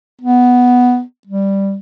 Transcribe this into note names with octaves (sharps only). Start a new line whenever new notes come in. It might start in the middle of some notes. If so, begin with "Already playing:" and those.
B3
G3